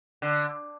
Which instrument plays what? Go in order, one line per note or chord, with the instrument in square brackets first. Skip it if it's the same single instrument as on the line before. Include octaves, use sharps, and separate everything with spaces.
[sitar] D3